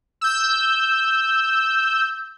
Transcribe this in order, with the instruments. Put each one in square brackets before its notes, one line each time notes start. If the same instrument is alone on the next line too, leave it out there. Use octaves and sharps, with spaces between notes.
[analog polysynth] E6 G6